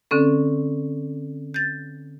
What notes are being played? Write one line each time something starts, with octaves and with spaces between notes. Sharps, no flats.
D3 C4 C#4 A4
G6 A6